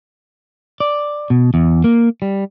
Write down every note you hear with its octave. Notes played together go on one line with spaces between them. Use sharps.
D5
B2
E2
A#3
G3